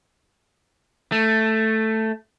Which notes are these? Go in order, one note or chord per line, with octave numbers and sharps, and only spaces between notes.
A3